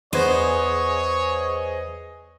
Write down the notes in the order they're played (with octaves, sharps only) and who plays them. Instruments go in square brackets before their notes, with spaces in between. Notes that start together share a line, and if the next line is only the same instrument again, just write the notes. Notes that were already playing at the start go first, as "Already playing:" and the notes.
[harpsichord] E2 B3 [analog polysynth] G#4 D#5 [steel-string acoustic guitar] C5 [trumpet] C#5